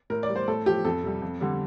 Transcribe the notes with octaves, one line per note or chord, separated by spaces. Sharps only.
A2 A#4
D5
G3
C5
A2 A4
F3 G4
F2 A4
C3 G3
F2
D3 G3